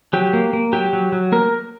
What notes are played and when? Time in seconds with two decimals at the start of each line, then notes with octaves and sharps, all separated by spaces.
0.13 F#3 G4
0.33 A#3
0.53 A#3
0.73 F#3 G4
0.93 F#3
1.12 F#3
1.32 A#3 A#4